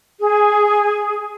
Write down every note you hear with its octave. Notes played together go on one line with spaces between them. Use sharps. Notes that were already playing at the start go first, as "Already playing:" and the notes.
G#4